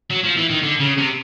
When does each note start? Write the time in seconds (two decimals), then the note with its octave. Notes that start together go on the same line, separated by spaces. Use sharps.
0.11 F#3
0.24 F3
0.38 E3
0.51 D#3
0.63 D3
0.80 C#3
0.98 C3